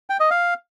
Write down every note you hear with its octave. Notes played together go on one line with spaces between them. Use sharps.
G5
D#5
F5